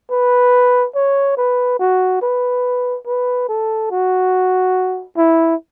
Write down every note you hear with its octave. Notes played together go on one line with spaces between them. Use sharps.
B4
C#5
B4
F#4
B4
B4
A4
F#4
E4